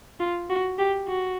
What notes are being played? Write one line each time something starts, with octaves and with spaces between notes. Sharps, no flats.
F4
F#4
G4
F#4